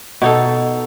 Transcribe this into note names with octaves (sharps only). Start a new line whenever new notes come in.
B2 D#4 A4